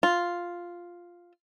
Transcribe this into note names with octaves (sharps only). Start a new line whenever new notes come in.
F4